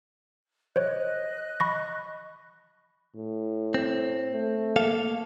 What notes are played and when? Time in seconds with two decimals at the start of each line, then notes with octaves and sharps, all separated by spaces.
0.76 C5 C#5 D#5 F#6
1.60 B5 C#6 A#6
3.16 A2
3.74 C4
4.32 A3
4.76 A#3 A4 F5